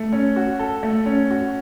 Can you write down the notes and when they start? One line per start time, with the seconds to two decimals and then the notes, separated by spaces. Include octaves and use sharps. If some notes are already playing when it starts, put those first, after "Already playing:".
Already playing: A3
0.13 C#4
0.36 F#4
0.59 A4
0.83 A3
1.06 C#4
1.30 F#4